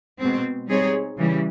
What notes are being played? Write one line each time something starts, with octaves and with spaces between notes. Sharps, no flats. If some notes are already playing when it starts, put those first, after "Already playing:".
B2 G#3 C4
G3 C4 D#4 G#4 C#5
C#3 E3 G3